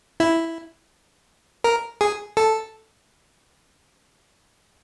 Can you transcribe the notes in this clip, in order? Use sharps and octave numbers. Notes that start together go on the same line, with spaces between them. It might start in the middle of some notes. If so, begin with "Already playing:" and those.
E4
A#4
G#4
A4